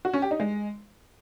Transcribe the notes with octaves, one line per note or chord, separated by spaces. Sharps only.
F#4
C#4
G4
D#4
G#3